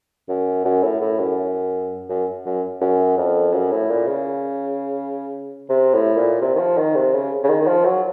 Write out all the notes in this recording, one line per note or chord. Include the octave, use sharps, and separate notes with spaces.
F#2
F#2
A2
A2
F#2
F#2
F#2
F#2
F2
F#2
A2
A#2
C#3
C3
A2
A#2
C3
D#3
F3
D#3
C3
C#3
C#3
D#3
D#3
F3
F#3